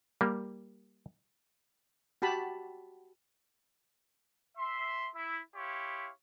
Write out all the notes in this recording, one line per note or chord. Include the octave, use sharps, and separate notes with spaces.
G3 A#3
F#4 G4 A5 B5
E5 C6
E4
E4 G4 C#5 F5 C6